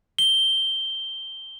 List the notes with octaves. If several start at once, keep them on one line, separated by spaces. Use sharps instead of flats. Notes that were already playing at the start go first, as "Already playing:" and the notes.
G7